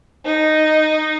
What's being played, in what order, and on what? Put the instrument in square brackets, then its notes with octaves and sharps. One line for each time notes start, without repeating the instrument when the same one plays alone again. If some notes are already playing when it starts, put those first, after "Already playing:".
[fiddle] D#4